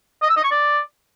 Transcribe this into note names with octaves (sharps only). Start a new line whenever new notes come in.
D#5
E6
D#5
C#6
D5